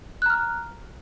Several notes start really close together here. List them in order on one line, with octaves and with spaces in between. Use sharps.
F#6 A#5 F6